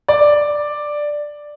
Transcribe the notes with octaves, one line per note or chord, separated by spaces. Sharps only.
D5